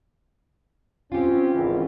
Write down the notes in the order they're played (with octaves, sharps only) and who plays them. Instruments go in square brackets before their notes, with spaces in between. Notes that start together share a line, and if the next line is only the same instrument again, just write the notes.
[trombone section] C4 C#4 [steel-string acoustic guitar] F4 G4
[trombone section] G#1 C#2 E3